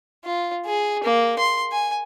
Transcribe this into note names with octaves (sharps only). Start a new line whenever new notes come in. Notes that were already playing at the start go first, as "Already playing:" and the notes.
F4
G#4
A#3
C6
G#5